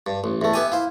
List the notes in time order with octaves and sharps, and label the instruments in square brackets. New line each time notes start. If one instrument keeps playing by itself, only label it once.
[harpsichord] G2
A1
[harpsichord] E2 A3 [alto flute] E5
[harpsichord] B3 G4 G#5
[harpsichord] E4 C5 [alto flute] F5